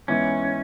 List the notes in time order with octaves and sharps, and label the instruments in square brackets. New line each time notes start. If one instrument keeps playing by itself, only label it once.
[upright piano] G#2 E3 B3 E4 [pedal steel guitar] C#4